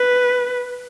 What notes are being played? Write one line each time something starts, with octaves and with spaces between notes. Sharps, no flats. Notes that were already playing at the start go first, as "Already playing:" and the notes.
Already playing: B4